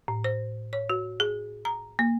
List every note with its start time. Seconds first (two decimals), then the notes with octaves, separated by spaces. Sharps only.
0.08 A2
0.24 C5
0.73 C#5
0.90 F#4
1.20 G#4
1.65 A#5
1.99 A#3